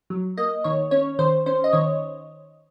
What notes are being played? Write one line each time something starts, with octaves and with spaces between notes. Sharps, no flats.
F#3
A#3 D#5
D#3 C#5
C#4 C#5
D#3 C5
C#4 C5
D#5
D#3 C#5